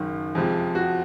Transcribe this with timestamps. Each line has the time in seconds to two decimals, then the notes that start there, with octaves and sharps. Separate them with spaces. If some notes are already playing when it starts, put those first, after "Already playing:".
Already playing: F#1 F#2 D#3
0.35 F2 C3 F3 G#3
0.75 F#4